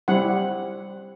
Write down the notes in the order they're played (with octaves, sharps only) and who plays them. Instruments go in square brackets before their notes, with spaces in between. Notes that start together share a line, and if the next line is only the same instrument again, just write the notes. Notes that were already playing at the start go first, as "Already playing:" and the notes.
[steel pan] G3 C4 E4 F#5